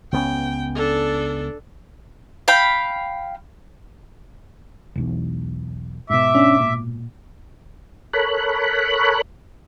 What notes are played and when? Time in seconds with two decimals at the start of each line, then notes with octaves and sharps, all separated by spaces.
0.12 C#2 B3 C#4 G5
0.75 D4 A4
2.48 F5 G5 B5
4.96 E1 B1 E2
6.10 G#2 B2 E5 D6
6.35 C#4 D4
6.60 A#2
8.13 A4 A#4 C#5 B5 F#6